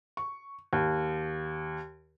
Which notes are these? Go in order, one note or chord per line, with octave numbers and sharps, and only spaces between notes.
C#6
D#2